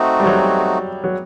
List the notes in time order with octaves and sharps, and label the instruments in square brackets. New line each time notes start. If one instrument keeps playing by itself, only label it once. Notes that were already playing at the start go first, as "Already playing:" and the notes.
Already playing: [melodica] A3 C4 D#4 F#4
[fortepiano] G3
F#3
F#3